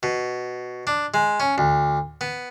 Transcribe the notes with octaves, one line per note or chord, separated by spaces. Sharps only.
B2
D4
G#3
C#4
D2
B3